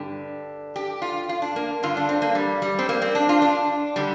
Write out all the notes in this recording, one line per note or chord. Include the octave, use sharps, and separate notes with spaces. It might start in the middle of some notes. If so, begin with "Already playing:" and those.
Already playing: G2 D3 G4
G4
F4
F4
D4
A#3
G2 D3 F4
D4
C4
A#3
G3
G3
C4
A#3
C4
D4
F4
D4
D3 G3